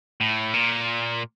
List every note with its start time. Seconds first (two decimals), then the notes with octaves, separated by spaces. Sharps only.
0.21 A2
0.54 A#2